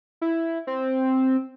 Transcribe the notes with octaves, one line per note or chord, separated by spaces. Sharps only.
E4
C4